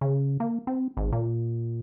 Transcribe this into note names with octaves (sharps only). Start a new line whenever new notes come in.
C#3
A#3
C4
G#1
A#2